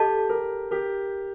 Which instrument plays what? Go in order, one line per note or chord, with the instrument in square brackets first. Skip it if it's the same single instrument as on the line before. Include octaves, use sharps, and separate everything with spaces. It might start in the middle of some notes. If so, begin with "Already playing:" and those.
Already playing: [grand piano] G4 [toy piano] A4 D#5 A5
[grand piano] G4 A#4
G4 A#4